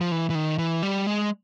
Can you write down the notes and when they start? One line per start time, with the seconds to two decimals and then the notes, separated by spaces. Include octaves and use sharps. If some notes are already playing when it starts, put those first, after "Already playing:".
0.01 F3
0.12 E3
0.30 E3
0.35 D#3
0.58 E3
0.83 G3
1.07 G#3